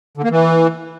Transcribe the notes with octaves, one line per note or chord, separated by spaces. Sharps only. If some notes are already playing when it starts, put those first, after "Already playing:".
D3
A#3
E3